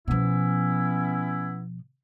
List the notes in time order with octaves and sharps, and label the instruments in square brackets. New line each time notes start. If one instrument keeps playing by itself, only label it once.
[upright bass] B2 F3 [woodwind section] B3 C#4 E4